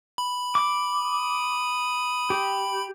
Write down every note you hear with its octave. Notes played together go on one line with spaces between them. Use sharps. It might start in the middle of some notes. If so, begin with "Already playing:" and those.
B5
D6
D#6
G4